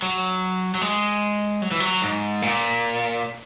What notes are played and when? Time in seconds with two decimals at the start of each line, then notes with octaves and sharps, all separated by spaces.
0.02 F#3
0.75 F#3
0.82 G#3
1.62 F#3
1.71 E3
1.80 F#3
2.02 G#2
2.42 A#2